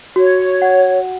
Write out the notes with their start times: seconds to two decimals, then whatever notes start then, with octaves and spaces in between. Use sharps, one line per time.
0.16 F#4 C#5
0.62 F#5